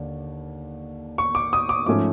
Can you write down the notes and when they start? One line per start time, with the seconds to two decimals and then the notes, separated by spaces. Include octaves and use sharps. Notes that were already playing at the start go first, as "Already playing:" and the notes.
Already playing: D#2 D3
1.18 C#6
1.35 D6
1.53 D#6
1.69 D6
1.86 G#2 F3 A3 C#4 D6